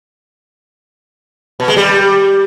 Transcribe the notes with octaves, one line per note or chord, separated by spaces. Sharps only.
B2
G#3
G3